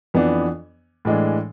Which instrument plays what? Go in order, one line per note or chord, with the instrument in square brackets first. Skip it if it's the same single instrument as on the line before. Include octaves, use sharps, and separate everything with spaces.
[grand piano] F2 E3 B3 D4
A2 E3 G#3 D4